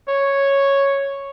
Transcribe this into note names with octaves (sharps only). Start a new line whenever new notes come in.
C#5